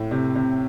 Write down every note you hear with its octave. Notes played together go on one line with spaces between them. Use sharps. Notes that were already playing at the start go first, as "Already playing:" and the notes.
Already playing: A2
C3
C3